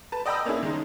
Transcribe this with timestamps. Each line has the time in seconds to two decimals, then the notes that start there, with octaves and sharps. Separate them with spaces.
0.12 B4 A5
0.26 D5 D#5 G5 A#5 B5 E6
0.45 A#3 C#4 D4 E4 G#4
0.63 D#3 G#3 D#4